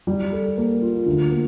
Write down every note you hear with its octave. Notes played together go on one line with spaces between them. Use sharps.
G3
A4
A#3
F4
D2
A#3